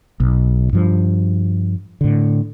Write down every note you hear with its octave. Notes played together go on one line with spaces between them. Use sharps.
B1
G2 F3
A2 D3